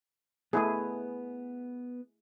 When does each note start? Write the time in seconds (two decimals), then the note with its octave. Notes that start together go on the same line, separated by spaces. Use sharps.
0.53 A3 B3 E4 G#4 B4 B5